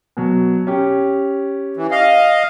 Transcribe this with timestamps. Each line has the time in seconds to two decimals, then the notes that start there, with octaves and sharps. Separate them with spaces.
0.17 B2 F#3
0.67 C#4 G4
1.77 E3
1.91 D#5 F5